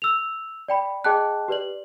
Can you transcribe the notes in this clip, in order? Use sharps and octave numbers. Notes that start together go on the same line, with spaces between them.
E6 F7
D5 G5 B5
G#4 D#5 G5 A5 F#6
G4 B4 D5 F#7